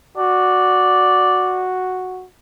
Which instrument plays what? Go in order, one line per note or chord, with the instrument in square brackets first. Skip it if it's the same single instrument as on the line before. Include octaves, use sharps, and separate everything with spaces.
[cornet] F#4 [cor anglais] D5